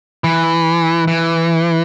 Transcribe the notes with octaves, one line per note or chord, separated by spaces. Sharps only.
E3
E3